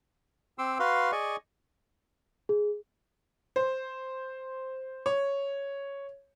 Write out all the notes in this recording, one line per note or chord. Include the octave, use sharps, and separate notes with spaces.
C4 C6 D6 E6
F#4 B4 F5 C6
G#4 D5 D#5 C#6
G#4
C5
C#5